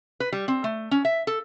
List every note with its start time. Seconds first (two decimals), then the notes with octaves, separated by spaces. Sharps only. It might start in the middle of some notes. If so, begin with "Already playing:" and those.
0.20 B4
0.32 G3
0.48 C4
0.64 A3
0.91 C#4
1.05 E5
1.27 A4